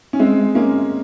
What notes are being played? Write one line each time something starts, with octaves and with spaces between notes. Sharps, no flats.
C#4
G#3 C4
A#3 C#4